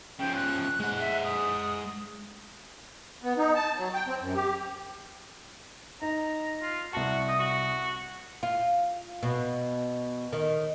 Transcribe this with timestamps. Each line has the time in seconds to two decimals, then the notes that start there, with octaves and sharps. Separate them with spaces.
0.19 C#3 F3 G5
0.35 F#6
0.80 G#3 F#5
1.00 E5
1.24 D#6
3.23 B3
3.38 D#4
3.55 A5
3.77 F#3
3.94 G5
4.07 C4
4.20 F#2
4.34 G4
6.02 D#4 A#5
6.61 F4
6.93 C2 F#4 A5
7.28 D#5
7.39 F#4
8.43 F4
9.23 B2
10.33 D#3